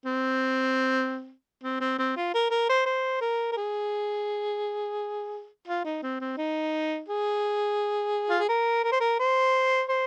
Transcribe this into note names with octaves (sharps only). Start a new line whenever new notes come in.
C4
C4
C4
C4
F4
A#4
A#4
C5
C5
A#4
A#4
G#4
F4
D#4
C4
C4
D#4
G#4
F4
G#4
A#4
A#4
C5
A#4
C5
C5